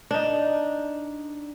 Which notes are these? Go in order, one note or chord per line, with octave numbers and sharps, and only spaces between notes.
D4 D#4